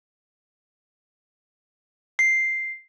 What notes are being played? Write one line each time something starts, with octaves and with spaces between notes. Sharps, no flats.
C7